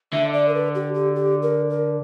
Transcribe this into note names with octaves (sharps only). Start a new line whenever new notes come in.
D3 E5
D5
A#4
B4
G4
G4
G4
A#4
A#4